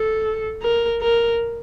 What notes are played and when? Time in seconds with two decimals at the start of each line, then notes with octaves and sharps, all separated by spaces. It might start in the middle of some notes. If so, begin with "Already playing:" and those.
Already playing: A4
0.62 A#4
1.02 A#4